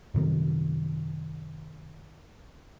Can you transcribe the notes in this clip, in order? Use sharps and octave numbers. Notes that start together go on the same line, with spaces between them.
F#2 C3 D#3